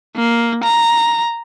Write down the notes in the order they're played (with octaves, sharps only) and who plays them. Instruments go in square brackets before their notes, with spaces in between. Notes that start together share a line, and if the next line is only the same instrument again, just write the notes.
[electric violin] A#3
A#5